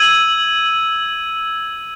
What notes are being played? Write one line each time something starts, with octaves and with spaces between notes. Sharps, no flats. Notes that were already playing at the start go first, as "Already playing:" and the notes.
Already playing: E6 G#6 D#7 F#7